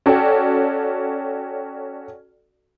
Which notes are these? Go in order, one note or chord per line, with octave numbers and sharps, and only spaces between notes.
C#4 F#4 A4 D5 G5